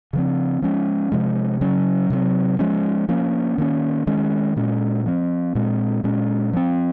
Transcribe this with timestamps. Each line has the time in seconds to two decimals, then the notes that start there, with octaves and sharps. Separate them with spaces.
0.13 C#3 F3 C4
0.62 F3 G#3 C#4
1.12 C3 F3 G#3
1.61 C#3 F#3 C#4
2.10 C3 F#3 C4
2.59 F3 G#3 C#4
3.09 F3 A#3 C#4
3.58 D#3 A#3 C#4
4.07 D#3 G#3 C#4
4.56 A#2 G#3 C#4
5.06 F3 C4
5.55 A#2 G#3 C4
6.04 A#2 G#3 C#4
6.53 F3 C4